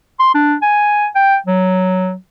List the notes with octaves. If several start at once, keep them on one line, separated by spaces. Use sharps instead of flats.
C6
D4
G#5
G5
F#3